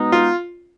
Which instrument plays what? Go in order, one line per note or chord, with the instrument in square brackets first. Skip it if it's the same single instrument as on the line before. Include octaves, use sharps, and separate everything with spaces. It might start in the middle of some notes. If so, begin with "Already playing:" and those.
Already playing: [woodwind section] B2 G#3 B3 D#4
[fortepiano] F4